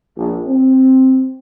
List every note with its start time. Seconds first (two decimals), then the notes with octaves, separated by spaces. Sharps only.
0.17 A#1
0.47 C4